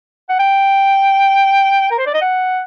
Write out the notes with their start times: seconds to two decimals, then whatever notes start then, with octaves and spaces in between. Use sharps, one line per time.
0.29 F#5
0.39 G5
1.91 A#4
1.98 C5
2.06 D5
2.14 D#5
2.21 F#5